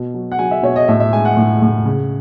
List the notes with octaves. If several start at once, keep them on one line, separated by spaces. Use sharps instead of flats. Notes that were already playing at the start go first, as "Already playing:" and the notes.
Already playing: B2
F#3
F#5
F#3 G#5
E5
B2 C#5
D#5
A2 E5
E5
G#3 G#5
F#5
A2
A2
C#3